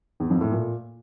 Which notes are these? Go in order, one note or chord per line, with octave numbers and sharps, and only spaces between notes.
E2
F2
A2
A#2